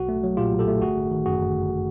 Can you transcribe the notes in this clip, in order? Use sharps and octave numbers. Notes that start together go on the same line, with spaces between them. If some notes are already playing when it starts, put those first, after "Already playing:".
Already playing: B1 F#4
A3
F#3
A#2 F4 G4
B1
G4 A4
A3
G1 F#4 G#4
G1
D#3
F#2 F#4 G#4
G1
G1